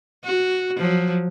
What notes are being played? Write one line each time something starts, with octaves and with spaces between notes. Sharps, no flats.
F#4
F3 F#3